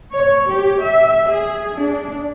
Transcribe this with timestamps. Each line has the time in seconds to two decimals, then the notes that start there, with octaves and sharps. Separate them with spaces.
0.13 C#5
0.48 G4
0.82 E5
1.29 G#4
1.77 D4